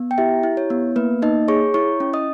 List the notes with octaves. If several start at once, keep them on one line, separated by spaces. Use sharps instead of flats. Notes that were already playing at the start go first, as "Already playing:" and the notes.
Already playing: B3
G5
E4 G4 E5
E4
C#5
B3
A#3 B4
A#3 D#4 D#5
G#4 C#5 C#6
E4 C#5 C#6
C#4
D#5 D#6